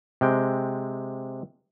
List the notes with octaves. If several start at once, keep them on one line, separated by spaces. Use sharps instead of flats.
C3 G#3 G5